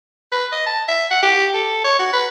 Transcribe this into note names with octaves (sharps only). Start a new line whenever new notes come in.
B4
D#5
A5
E5
F#5
G4
A4
C#5
F#4
B4